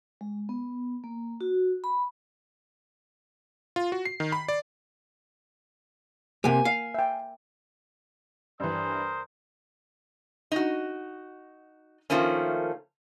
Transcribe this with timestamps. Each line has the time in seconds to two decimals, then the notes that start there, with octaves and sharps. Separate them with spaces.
0.21 G#3
0.49 B3
1.04 A#3
1.41 F#4
1.84 B5
3.76 F4
3.92 F#4
4.05 C7
4.20 D#3
4.32 B5
4.48 D5
6.44 C3 A#3 G4 F#5 G#5
6.65 F5
6.94 E5 G5
8.60 G2 E3 A#4 C5 D#6
10.52 D#4 F#4
12.10 D#3 F3 A3 A#3 C#4